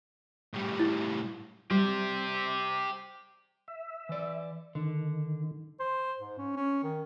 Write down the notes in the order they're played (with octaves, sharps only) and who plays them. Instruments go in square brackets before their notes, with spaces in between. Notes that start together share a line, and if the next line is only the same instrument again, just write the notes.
[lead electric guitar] A2 G3
[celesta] E4
[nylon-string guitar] G3 [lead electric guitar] G4 C5
[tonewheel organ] E5
[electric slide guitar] E3 D5
[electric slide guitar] D3 [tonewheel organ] D#3
[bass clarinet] C5
G#2
C#4
C#4
D#3